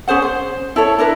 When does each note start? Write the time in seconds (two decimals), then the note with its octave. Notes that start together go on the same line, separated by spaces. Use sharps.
0.08 C#4 G#4 C5 F#5
0.22 C5
0.76 E4 A4 C#5
0.99 D4 E4 A#4 B4